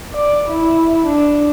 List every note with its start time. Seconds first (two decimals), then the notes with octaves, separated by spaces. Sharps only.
0.14 D5
0.48 E4
1.06 D4